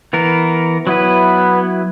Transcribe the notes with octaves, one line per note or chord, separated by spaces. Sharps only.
E3 B3 A#4
F#3 B3 E4 B4